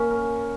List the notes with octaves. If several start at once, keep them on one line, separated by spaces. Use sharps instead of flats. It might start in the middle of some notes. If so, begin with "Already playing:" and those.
Already playing: A#3 C#4
A#4